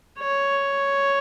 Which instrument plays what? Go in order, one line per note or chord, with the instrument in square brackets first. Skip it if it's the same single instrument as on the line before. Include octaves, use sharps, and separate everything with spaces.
[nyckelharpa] C#5